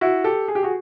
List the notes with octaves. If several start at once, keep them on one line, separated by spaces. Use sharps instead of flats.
E4 F#4
G4 A4
G#4
G4
F#4 G#4